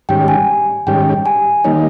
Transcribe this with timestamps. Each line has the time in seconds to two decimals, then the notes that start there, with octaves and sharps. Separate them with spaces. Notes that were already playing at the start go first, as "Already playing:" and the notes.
0.09 G#2 D#3 G3 C#4 G4 G5
0.28 G#5
0.87 G#2 D#3 G3 C#4 G4 G5
1.26 G#5
1.64 D#3 G3 A#3 D#4 C#5